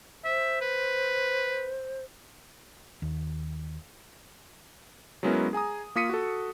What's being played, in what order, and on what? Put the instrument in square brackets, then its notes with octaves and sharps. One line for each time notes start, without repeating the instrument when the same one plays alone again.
[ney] C5 [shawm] E5
[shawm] B4
[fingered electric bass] D#2
[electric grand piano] F#3 G#3 B3 C#4 E4 A#4
G#4 G#5 A#5 D#6
A#3 F4 D#6 B6 C#7 D#7
F#4 A4